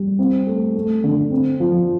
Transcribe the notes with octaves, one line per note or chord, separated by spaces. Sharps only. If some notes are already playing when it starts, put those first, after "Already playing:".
Already playing: G3
C4
A3
A3
D3
C4
F3